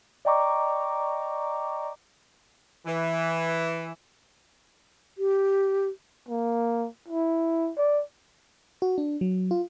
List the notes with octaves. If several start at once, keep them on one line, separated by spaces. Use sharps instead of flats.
D5 D#5 G5 A#5 C#6 D6
E3
G4
A#3
E4
D5
F#4
D4
F#3
F4